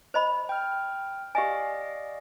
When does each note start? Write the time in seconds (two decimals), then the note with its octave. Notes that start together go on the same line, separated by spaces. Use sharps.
0.14 C5 D#5 B5
0.49 G5 F6
1.35 G4 D5 D#5 F5 G#5